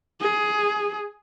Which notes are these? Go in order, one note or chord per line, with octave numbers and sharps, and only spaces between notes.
G#4